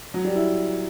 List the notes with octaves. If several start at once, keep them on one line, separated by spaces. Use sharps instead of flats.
F#3
G3
E4